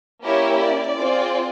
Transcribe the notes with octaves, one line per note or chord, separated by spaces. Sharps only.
A#3 C#4 E4 G4 C#5
D5
C4 F4 G#4